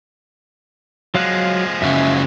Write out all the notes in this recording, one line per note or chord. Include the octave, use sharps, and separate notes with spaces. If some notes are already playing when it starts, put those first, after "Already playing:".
F3 F#3 G#3 F5 F#6
F#2 C#3 E5